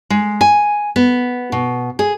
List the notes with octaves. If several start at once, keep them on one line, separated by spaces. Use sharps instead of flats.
G#3
G#5
B3
B2
G#4